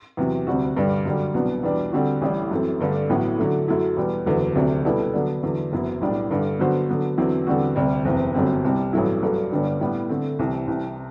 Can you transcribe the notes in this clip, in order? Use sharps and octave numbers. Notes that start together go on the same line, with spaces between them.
E2 C3 F#3
D2 C3 G3 C4 F#4
G2 D3 G3 D4
F#2 D3 G3
C2 B2 F#3 B3 D4
E2 B2 G3 D4
D3 G3 C4 F#4
A1 A2 G3
F#2 E3 A3 C4
G2 D3 A3 D4
A1 A2 F#3 B3
D3 F#3 A3
F#2 F#3 A3 E4
E2 B2 G3
F#1 E2 D3 F#3 A3
D2 C3 F#3 A3 D4
B2 G3 B3 E4 A4
D3 F#3 B3 D4
E2 D3 F#3
F#1 F#2 E3 B3 E4
B1 A2 G3 B3 D4
G2 D3 A3 D4
D3 F#3 B3 F#4 C5
D3 F#3 B3
E2 D3 F#3 C4 E4
E2 D3 G3 C4 F#4
D2 C3 G3
F#1 E2 C3
G1 F#2 D3 G3 C4
C2 C3 G3
A1 G2 F#3 A3 E4
G2 F#3 A3 D4 A4
G1 G2 D3 G3 D4
A2 G3 B3
D3 A3 C4
C2 C3 E3
C2 C3 E3